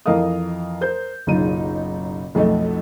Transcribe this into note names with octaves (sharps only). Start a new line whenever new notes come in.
F2 E3 A#4 D#5 F5 D#6
A#4 C5 G6
F#1 B1 C#3 D#4 F4 D#7
B1 F2 A3 D#5